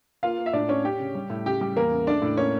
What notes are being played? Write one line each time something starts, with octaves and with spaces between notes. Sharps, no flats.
A#3 F4 F5
A#3
E5
A2 D4 D5
C#4 C#5
C#4 G4
C#3
G3
A2
C#3 G4
G3 G4
E2 A#3 A#4
C#3
A3 D4 D5
A2
A#3 C#4 C#5